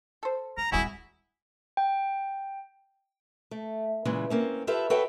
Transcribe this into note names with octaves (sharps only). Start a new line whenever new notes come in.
A4 C5
F3 A#5
D1 G3 E4 F#4 G#4 F#5
G5
A3
A#2 C#3 E3 G#3
A#3 C4 C#4
F4 G4 A4 B4 E5
F#4 A4 B4 C#5 E5 G5